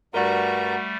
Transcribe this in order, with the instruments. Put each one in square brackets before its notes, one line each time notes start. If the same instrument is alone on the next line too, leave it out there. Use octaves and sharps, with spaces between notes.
[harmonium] G2 A#5 [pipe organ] G3 A3 [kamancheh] F#4 [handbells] A#4 D5